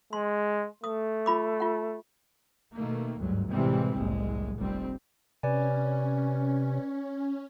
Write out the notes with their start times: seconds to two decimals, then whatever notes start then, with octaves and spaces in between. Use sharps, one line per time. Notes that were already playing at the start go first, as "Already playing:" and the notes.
0.13 G#3 C6
0.84 A3 D#6
1.26 F4 B5 D6
1.60 F4 F#5
2.75 B2 D#3 A3 A#3
3.18 G1 D2 G#2 F#3
3.50 A2 C3 E3 G3 G#3 C4
3.97 F#1 C2 A2 G#3
4.57 F1 A#1 G3 C4
5.43 C3 C#4 B4 D5 G#5